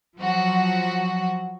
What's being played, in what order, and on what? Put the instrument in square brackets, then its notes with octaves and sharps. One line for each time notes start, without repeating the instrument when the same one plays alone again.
[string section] F3 F#3 F#4